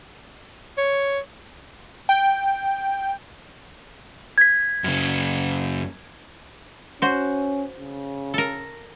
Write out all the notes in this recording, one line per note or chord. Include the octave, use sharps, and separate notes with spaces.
C#5
G5
G#6 B6
F#2 C#3
C#4 F#4 C5
C#3
A4 A#4